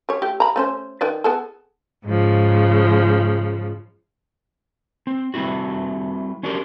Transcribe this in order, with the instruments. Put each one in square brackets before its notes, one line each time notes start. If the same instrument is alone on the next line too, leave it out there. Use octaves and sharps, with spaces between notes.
[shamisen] G3 C#5
A3 G4
A#5 B5
A3 C#4 C5
D#3 B4 D5
B3 G#4 A4
[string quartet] G#2 C#3 F3
[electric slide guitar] C4
G3 A3 C4 E4 F#4
C#4 D4 F#4 G4 A#4